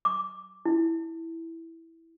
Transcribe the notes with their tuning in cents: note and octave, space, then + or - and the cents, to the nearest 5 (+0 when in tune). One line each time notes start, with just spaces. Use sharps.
D6 -5
E4 -5